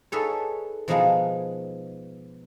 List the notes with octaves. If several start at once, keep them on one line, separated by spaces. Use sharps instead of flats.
D#4 G#4 A4 B4 C#5
B2 F3 G#3 B3 D#4 G#4